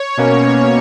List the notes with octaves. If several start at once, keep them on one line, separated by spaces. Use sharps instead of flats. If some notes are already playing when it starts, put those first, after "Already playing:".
Already playing: C#5
B2 A#3 C#4